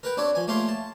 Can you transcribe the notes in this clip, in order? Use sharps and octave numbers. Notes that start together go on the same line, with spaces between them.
A#4 B4 G5
C4 D4 G4 C#5 D5
F3 G#5
A3 A#3 G4 C#5 F5 C6
A5